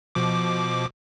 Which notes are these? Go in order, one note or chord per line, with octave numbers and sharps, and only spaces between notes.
B2 F3 D6